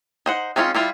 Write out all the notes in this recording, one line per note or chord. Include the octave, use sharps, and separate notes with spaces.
D#4 C5 F#5
G#3 C4 C#4 D#4 F4
G3 E4 F4